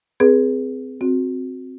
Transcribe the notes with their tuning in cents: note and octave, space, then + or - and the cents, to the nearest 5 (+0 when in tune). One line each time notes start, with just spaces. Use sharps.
C4 -20 G#4 +0 B4 -30
C4 +0 F#4 -20